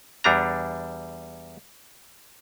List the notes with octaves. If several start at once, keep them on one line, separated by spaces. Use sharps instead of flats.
E2 G3 D4 A#5